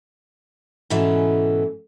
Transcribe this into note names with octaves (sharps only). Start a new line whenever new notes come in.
G#2 B2 E3 A3 C#4